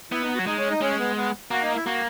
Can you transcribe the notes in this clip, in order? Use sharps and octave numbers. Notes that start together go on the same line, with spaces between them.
B3 E4
D#4
F#3 F#4
G#3 D#4
C#4
D#4
G#3 C#4
B3
B3
A#3 F#4
D#4
E4
A#3 F#4